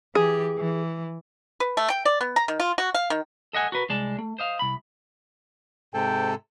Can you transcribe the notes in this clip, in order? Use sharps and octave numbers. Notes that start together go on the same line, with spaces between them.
E3 G4 G#4
E3
B4
A3
G5
D5
B3
A#5
D#3
F4
F#4
F5
D#3
A4 D#5 F#5 G#5
F#4 A#4 B4
C2 G#3 D5 A5
A3
C5 D#5 F5
C2 B5
G#2 C3 A4 G5